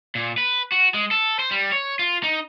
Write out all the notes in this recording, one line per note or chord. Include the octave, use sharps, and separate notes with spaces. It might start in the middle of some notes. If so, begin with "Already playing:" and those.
A#2
B4
F#4
G#3
A4
C5
G3
C#5
F4
D#4